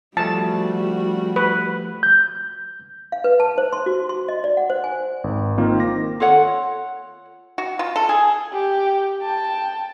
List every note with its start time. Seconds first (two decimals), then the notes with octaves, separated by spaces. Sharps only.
0.17 F3 G3 A3 F#4 A5
1.36 B4
2.03 G6
3.12 F5
3.24 B4
3.40 A5
3.58 C5
3.73 C6
3.86 F#4
4.09 C6
4.28 D#5
4.44 D5
4.57 F#5
4.70 C5
4.84 G#5
5.24 G#1
5.58 D#3 A#3 C4 F4
5.80 D#3 D6 A#6
6.20 F4 A4 C#5 F#5
7.58 F#4
7.79 F4
7.96 A4
8.09 G#4
8.53 G4
9.20 G5 A5